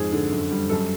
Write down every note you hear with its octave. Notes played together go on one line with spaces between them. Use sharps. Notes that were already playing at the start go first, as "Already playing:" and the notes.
Already playing: F2 G#2 G#4
D3
F#2
G3
F#2 A4